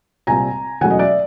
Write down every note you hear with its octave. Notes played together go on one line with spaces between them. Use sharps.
C2 A#2 G3 C4 G#5 A#5
E2 B2 F#3 A3 C#4 F#5 G#5
D#5
D5 E5